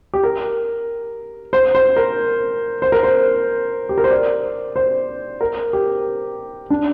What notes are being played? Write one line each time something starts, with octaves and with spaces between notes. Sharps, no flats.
G4
A#4
C5
C5
A#4
C5
A#4
C5
G4
A#4
C5
D5
C5
A#4
G4
D4